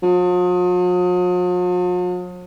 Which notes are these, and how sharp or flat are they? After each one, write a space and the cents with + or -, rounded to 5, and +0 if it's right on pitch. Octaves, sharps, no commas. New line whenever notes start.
F3 +45